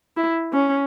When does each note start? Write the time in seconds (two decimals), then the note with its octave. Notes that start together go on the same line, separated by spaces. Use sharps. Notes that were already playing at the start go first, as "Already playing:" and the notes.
0.17 E4
0.53 C#4